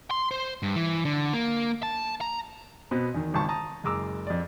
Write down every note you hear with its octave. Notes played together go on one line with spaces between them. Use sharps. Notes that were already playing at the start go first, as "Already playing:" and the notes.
C6
C5
G2
E3
D3
A#3
A5
A#5
B2 B3 C4
E2 D#3
G#1 C#2 A5 C#6
A5 A#5 D#6
F#1 G#3 A#5 D6 E6
F2 D5